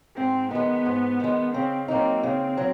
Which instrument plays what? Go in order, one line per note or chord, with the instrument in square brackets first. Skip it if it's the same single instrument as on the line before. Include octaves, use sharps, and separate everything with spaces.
[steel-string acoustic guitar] G#2 [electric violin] C4
[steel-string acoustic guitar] D#3 G#3 [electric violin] B3
[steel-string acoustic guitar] G#2
D#3 G#3
[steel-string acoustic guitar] C#3 [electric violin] C4
[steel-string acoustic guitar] F#3 A#3 D#4 [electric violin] C4
[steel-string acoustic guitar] C#3 [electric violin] C4
[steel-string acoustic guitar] F#3